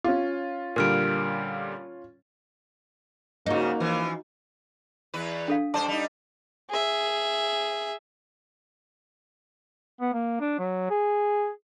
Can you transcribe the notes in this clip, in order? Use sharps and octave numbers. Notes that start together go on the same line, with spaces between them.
C#4 F4
A#2 D3 G3 A#4 F6 D7
G#2 C#3 A#3 D#4 F#4
E3 F3
E2 B4
D4 A4 F5
G2 A4 C5 D5 A5 D6
G3 D#4
G#4 E5
B3
A#3
D4
F#3
G#4